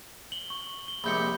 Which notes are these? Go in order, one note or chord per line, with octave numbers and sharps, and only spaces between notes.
F#7 G7
C#6
G7
A#1 C3 G#3 B5 G6 C#7